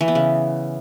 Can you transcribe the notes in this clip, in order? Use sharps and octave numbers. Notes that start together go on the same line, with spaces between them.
E3
B3
C#3